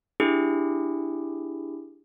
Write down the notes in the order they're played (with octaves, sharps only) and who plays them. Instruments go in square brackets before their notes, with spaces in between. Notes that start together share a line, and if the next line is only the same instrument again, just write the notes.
[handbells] D4 E4 G4 G#4